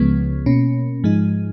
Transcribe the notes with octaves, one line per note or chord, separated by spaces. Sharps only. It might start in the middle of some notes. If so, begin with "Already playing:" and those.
Already playing: C#2 C#3 F3 G#3 B3
B2 A#3 C#4
G#2 F3 G#3 D#4